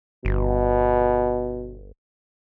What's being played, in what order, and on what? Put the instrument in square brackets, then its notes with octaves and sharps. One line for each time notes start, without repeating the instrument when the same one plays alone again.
[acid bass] G1 [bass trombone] B2